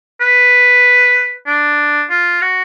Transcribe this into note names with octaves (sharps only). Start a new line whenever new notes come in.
B4
D4
F4
F#4